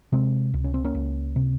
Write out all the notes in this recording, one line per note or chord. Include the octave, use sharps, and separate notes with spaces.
C3 G#3 C4
C#2
C#4
C4
A#3 C#4
C#2
C3